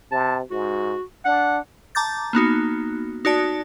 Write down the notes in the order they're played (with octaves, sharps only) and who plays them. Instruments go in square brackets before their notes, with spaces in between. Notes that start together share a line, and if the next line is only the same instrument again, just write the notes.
[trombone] C3 [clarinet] A5
[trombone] G#2 [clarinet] F#4
[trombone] D4 [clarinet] F#5
[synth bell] A5 A#5 D6 G6 A6
A#3 B3 D#4 F#4
D#4 F#4 D5 A5